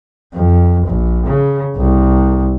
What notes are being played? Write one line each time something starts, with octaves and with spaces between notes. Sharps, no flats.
F2
A#1
C#3
C2